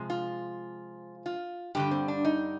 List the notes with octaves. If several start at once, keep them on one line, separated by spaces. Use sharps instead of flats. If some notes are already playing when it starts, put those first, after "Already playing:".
Already playing: C3 F3 G#3
F4
F4
G2 D3 G3 G4
C4
D4
D#4